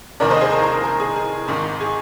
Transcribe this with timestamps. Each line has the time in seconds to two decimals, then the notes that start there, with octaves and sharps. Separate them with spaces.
0.20 F1 D#2 D#3 A#4 D5
0.30 C5 D#5
0.41 G#4 C5
0.52 A#4
0.63 A#4
0.84 A#4
1.00 G#4
1.16 G#4
1.48 G#1 G#2 D#3
1.80 G#4